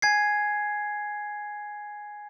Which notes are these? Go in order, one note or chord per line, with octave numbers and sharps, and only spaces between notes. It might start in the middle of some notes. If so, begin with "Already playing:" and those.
G#5 G#6 C7